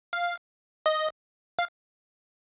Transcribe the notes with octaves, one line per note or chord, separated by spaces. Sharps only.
F5
D#5
F5